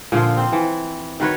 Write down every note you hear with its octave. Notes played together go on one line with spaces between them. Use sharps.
A#2 D3 F3 F4
C4
E3
D#3 F#4 B4 C#5